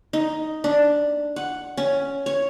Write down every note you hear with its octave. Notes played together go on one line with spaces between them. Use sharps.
D#4
D4
F#5
C#4
C#5